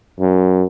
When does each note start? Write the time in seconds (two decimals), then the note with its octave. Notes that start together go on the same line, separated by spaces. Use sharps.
0.20 F#2